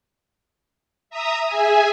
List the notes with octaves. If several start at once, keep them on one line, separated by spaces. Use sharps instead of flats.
E5 A#5 D#6
G#4 E5 G#5